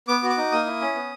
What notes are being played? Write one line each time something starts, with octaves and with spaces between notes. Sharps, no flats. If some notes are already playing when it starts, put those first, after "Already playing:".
B3 D6
F#4
D6
D#4
A#3 D#6
E4
C#4
B3